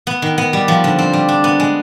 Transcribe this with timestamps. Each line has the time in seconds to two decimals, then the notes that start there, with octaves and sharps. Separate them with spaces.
0.07 B3
0.22 D#3
0.38 B3
0.53 G3
0.68 F3
0.84 D3
0.99 C4
1.13 G3
1.29 D4
1.44 B3
1.60 G#3